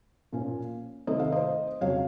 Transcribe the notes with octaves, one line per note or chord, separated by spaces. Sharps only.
A#2 F3 A#3 C#4
C3 D#3 A3 C4 D#5
F5
C5 D#5
F2 C#3 F#3 C#5 F5